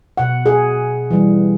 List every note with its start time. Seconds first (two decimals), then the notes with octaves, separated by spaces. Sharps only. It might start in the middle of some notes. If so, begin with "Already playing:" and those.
0.17 B2 F#5
0.46 G#4
1.11 E3 G3